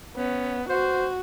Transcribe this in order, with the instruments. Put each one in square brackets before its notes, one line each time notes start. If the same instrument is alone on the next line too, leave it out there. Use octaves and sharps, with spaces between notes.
[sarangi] B3 [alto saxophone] C#4
[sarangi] F#4 [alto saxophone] C5